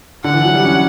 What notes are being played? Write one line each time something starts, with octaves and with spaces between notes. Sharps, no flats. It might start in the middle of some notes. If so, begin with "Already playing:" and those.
D3 F#5
E3
F#3
G3
C#4